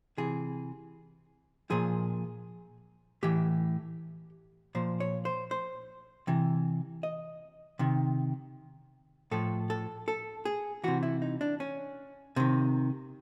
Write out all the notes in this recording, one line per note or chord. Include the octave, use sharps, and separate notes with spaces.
C3 E3 G#4
A#2 F3 G#4
A2 E3 G4
A#2 F3 C5
C#5
C5
C5
C3 E3
D#5
C3 D#3
A2 F3 A4
A4
A4
G#4
C3 E3 F#4
E4
D#4
D4
C#4
C3 D#3